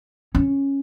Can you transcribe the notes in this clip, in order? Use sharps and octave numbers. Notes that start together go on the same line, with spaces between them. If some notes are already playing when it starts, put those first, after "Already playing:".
C#4